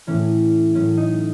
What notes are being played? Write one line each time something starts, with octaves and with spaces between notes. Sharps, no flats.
A2 E3 C#4
A2 F#3 C#4
D#4